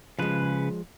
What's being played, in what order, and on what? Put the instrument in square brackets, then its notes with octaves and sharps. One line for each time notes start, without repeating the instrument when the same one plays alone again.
[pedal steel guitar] C#3 B4 [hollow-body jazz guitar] F3 G#3